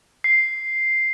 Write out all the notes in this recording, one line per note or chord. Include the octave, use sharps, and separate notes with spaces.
C7